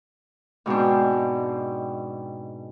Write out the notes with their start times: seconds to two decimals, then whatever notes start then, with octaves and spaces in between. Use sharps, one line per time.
0.66 G#2 B2 C4 D4